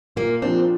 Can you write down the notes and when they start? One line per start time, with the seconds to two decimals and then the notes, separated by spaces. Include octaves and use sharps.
0.16 A#2 A#3
0.42 F3 A#3 C4 D4